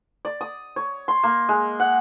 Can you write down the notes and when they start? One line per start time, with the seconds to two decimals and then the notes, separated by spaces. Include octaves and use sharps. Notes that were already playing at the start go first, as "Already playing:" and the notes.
0.25 D5
0.41 D#6
0.76 C#5
1.08 C6
1.24 A#3
1.49 G#3
1.80 F#5